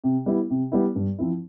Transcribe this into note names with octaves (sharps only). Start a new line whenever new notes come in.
C3
G3 B3 E4
C3
G3 B3 E4
G2
F3 C4 E4